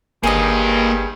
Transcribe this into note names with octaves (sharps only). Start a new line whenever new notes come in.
G1 G2 A#3 G#4 C5 D#5